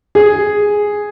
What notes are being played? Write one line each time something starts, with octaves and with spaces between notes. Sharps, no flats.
G#4